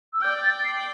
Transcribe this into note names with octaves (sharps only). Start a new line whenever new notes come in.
E6
D5 G5 G6
A6
C7